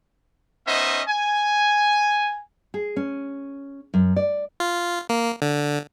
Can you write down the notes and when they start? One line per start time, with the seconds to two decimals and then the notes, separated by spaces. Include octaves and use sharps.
0.67 B3 C#4 D#4 C5 D#5 E5
1.08 G#5
2.74 G#4
2.96 C#4
3.94 F#2
4.16 D5
4.60 F4
5.09 A#3
5.42 D3